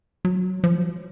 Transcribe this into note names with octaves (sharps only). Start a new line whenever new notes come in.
F#3
F3
F#3